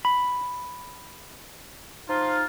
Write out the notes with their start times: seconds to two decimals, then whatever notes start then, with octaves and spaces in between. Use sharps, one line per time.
0.05 B5
2.08 F3 D#4 F4